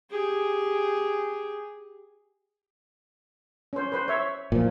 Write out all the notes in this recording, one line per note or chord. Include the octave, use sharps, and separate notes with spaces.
G4 G#4
C#4 C5
B4 C5
C#5 E5
A#2 F3